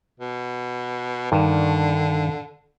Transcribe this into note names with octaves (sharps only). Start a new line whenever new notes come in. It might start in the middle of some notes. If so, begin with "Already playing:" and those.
B2
G2 D3 D#3